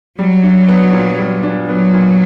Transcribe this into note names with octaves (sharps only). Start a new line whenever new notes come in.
F#3 G3
D4
B3
A#2
G3
D4
F#3 B3
A#2